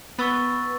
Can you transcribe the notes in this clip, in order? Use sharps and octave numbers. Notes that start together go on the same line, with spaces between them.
B3 B4 C#6 E6 A6